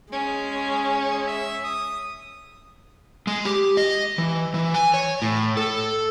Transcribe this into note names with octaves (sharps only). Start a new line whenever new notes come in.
G#3 C#4 G#4
E5
D#6
G#3
G4
D#5
E3
E3
G#5
C#5
A2
A4